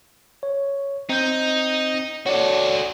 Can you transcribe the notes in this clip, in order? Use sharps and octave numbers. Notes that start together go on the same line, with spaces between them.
C#5
C4 D#4 G6
F#4 A4 C#5 D5